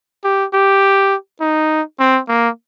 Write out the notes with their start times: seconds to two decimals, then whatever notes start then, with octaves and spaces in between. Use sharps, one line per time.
0.24 G4
0.54 G4
1.41 D#4
1.99 C4
2.29 A#3